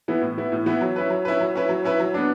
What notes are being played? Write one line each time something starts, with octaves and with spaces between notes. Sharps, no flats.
E3 B3 E4
A2
E3 B3 E4
A2
E3 B3 E4
F#3
C#4 E4 B4
F#3
C#4 E4 B4
F#3
C#4 E4 B4
F#3
C#4 E4 B4
F#3
B3 D4